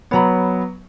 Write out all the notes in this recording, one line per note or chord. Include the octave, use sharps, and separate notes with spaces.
F#3 B3 C#5 A#5 B5